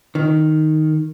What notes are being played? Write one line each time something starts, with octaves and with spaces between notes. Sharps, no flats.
D#3